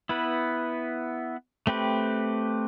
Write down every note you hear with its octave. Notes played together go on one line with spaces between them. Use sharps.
B3 E4 B4
A3 C4 G4 B4